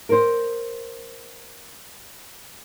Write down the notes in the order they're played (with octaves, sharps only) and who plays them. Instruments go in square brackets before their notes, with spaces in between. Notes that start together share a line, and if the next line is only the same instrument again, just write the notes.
[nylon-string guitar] A#4 C5